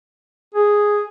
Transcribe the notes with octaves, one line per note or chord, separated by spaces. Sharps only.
G#4